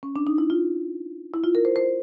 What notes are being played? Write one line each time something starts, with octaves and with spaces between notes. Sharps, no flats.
C#4
D4
D#4
E4
F4
E4
F4
A#4
C5
C5